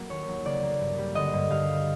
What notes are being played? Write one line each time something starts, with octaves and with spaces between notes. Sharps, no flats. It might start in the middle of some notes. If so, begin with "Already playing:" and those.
Already playing: F#3 A#3
D#2 C#5
F#3
C#3 D5
A#3
G2
G3
D3 D#5
G2
G2 F5
G3